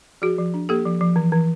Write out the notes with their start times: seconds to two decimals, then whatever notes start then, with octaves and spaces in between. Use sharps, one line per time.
0.22 F3 F#4 G#4
0.38 F3
0.54 D4
0.69 A#3 G4 A4
0.85 F3
1.01 F3
1.16 E3
1.32 E3